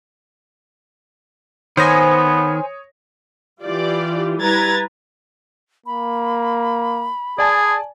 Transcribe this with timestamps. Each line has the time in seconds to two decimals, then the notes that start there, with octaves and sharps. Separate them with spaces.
1.77 D#3 B3 C5 C#5 G#5 D#6 A#6
3.63 E3 F4 G4 D5
4.40 G3 E4 B4 A#5 G#6 A6
5.86 A#3 B5
7.38 G#4 D5 G#5 A5